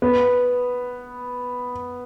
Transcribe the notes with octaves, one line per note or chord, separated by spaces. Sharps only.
B3